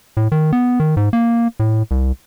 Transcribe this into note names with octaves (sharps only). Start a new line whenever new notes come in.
A2
D#3
B3
D#3
G#2
A#3
A2
C2